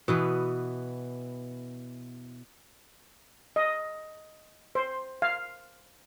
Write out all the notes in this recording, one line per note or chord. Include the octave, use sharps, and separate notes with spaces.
B2 E3 B3
D#5
C5
F5